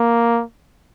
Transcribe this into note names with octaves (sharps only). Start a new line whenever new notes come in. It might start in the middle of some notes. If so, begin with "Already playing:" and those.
Already playing: A#3